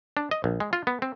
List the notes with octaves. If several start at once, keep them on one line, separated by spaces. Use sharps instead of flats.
D4
D#5
A#1
G#3
F4
B3
C4